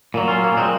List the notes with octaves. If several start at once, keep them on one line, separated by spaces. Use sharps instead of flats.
A#2 F#3
C#4 F4
A#3 C#4
A#2 F#3 G#3 C4